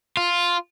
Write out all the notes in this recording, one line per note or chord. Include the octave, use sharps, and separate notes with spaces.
F4